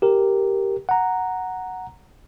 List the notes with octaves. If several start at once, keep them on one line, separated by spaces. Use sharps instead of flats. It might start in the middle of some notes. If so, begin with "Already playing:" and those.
G4 A#4
F#5 A#5